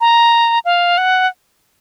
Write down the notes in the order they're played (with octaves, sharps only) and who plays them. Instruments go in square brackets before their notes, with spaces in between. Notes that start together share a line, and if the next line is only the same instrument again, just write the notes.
[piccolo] A#5
F5
F#5